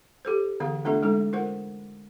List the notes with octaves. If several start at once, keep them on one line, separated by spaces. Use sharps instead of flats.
G4 A4 C5
D3 E3 B3 G#4 F5
A3 B3 D4 F4 A4 E5
G#3 C#4 D#4 A4
F4 A#4 C5 F#5